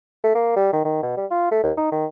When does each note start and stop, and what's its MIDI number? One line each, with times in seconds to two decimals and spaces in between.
0.24 0.34 57
0.35 0.55 58
0.56 0.68 55
0.72 0.83 51
0.84 1.01 51
1.02 1.16 47
1.17 1.26 55
1.31 1.50 65
1.51 1.63 57
1.63 1.72 39
1.77 1.90 63
1.92 2.05 51